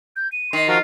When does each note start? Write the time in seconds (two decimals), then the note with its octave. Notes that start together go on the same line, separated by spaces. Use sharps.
0.16 G6
0.32 D#7
0.53 D#3 C6
0.68 F3 F4 F#4 A#4